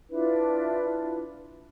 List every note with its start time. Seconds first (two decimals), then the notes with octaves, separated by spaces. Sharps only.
0.10 D4 E4 F4 B4